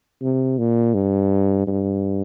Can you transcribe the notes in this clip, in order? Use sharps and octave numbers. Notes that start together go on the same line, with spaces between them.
C3
A#2
G2
G2